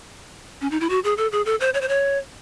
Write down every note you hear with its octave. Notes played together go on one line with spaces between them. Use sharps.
C#4
D#4
E4
F#4
G#4
A4
G#4
A4
C5
C#5
C5
C#5